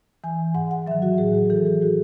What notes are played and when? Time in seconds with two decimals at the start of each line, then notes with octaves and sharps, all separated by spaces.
0.24 E3 G#5
0.55 G#2 F#5
0.71 F#5
0.87 F#3 E5
0.91 D#3
1.02 F#4
1.18 A2 G#4
1.34 G#4
1.50 E3 A4
1.67 G#4
1.82 A2 F#4